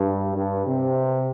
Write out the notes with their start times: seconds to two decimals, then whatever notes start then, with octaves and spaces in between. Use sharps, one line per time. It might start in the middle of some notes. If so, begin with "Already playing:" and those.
Already playing: G2
0.35 G2
0.65 C3